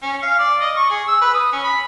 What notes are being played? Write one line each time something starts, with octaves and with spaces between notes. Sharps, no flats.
C#4
F5
D5
D#5
C#6
G#4
E6
B4
D#6
C#4
B5